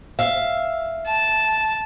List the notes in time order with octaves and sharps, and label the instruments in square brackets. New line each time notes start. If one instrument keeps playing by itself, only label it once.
[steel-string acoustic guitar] E5 F5
[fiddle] A5